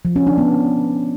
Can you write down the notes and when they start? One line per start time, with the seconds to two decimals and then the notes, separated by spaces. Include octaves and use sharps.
0.05 F3
0.16 C#4
0.27 D4
0.38 B3